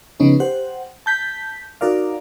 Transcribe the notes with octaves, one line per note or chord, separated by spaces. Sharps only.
C#3 F3 B3 C#4 D#4
G4 C5 F#5
A5 G6 B6
D#4 F#4 A#4 D5 F5